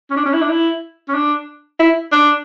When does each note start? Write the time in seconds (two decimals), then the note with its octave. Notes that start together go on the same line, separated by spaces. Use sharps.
0.11 C#4
0.17 D4
0.26 C#4
0.34 E4
0.42 D4
0.50 E4
1.09 C#4
1.14 D4
1.80 E4
2.12 D4